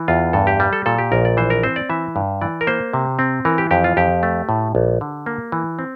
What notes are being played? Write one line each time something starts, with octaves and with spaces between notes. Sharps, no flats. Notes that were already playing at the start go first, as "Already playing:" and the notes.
Already playing: E3
E2 F4
G2 A4
G4
G3
A4
A#2 A4
G4
A#1 A#4
D5
E3 C5
A#4
C4 C5
D5
E3 E5
G2
E3 D5
A#4
A#3 C5
C3
C4
E3 A#4
G4
F2 G4
F4
F2 G4
A3
A2
A#1
D3
A#3
E3
C4